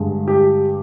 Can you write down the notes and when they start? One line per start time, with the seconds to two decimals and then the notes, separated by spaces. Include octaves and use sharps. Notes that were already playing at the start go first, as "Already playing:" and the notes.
Already playing: G2 D3 G#3
0.28 G4